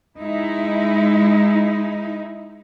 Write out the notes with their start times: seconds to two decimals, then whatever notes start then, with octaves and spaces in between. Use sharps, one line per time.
0.20 G#3 D#4 E4